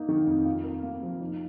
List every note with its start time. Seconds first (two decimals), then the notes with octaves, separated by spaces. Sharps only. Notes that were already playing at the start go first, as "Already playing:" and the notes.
Already playing: A#3 D#4
0.08 D#3
0.26 F2
0.45 F4
0.64 A#4
0.83 A#3
1.02 F3
1.21 D#4